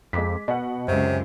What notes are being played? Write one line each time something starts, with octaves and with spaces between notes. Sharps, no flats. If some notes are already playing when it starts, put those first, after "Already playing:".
F2 G#3 D6 B6
B2 D#5 F#5
C#2 F#2 C3